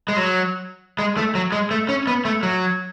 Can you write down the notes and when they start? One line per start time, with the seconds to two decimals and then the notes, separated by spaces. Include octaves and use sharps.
0.08 G#3
0.17 F#3
0.99 G#3
1.17 A3
1.35 F#3
1.52 G#3
1.71 A3
1.89 C#4
2.07 B3
2.25 A3
2.43 F#3